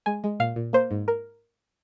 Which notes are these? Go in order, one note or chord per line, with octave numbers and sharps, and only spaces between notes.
G#3 G#5
G#3
A#2 F5
A#2
A#3 C5
G#2
A#4